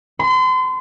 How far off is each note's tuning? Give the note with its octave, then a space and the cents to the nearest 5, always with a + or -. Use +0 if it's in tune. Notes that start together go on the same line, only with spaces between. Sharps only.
C6 -35